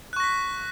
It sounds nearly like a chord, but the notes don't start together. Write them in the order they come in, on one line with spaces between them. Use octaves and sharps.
F#6 C#6 A#6 B6